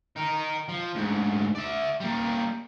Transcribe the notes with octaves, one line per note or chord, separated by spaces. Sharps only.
D#4 A#4
F3
D2 G#2
D5 E5
G3 A#3